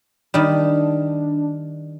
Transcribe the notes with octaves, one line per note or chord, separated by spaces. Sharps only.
D#3 G3 D4